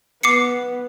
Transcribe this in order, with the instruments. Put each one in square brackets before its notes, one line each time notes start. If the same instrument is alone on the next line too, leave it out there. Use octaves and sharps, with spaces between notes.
[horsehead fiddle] B3 [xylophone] D6 C7 C#7